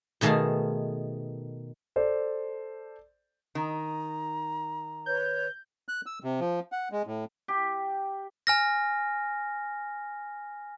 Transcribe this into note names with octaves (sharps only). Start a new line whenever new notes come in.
B2 D#3 A3 G#4 F5 A5
A4 C5 D5
D#3 A#5
B4 C#5 G6
F#6
E6
C3
F3
F#5
G#3
A2
G4
G#5 F6 A#6